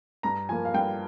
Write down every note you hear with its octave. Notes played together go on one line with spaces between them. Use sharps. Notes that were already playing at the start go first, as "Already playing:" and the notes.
G2 A#5
F3 A#3 G#5
F5
G2 G5